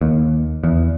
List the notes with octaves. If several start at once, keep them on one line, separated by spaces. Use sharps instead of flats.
D#2
E2